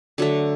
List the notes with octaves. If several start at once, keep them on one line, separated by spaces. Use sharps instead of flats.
D3 F#3 A3